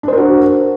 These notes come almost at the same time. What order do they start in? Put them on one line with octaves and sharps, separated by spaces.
D4 C5 A#4 F#4